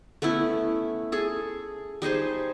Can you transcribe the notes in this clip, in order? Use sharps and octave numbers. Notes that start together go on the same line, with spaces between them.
A3 B3 C#4 E4
G#4 A4
G3 D#4 G#4 C5